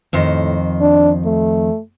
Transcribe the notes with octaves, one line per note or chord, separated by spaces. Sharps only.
F2 A2 D#3 C5
D4
A3